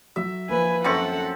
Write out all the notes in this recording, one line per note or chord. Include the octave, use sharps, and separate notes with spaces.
F#3 F#4 E5
F3 A#3 B4 G#5
F#2 C4 A4 F#5 C#6